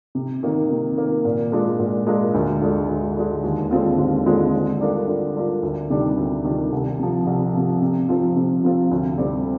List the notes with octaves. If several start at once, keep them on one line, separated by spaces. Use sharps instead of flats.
C3
D#3 A#3
C3
D#3 A#3
A#2
G#3 D4 F4 A#4
A#2
G#3 D4 F4 A#4
D2
D3 G#3
D2
D3 G#3
D#2
D3 G#3 C4 F4
D#2
D3 G#3 C4 F4
D3
G3 D4 F4 A#4
D3
G3 D4 F4 A#4
D2
C3 D#3 G3 D4
D2
C3 D#3 G3 D4
C2
C3 F3
C2
C3 F3
C3
F3 C4 F4
C3
F3 C4 F4
D2
C3 G3 C4